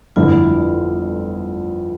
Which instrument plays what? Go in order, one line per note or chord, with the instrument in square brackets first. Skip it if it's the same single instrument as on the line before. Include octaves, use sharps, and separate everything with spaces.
[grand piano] G1 F2 D3 A3 E4 [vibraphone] F4